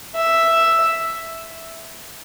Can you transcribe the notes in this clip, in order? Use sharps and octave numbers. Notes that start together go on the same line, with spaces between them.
E5